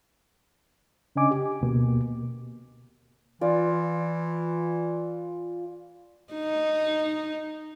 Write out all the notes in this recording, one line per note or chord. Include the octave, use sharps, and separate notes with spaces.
C#3 C#4 D4 D#5 G#5 D6
G4
D2 B2 A#3
E3 F4 D5
D#4